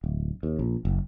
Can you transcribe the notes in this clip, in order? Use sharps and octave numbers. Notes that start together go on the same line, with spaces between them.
D1
D#2
A#1
F#1